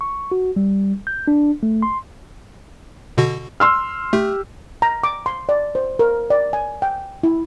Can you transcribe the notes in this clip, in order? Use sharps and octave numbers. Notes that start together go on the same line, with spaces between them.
C#6
F#4
G3
G6
D4
A3
C6
B2 D3 F#4
C6 E6 F6
A3 G4
A#5
D6
C6
D5
C5
A#4
D5
G#5
G5
E4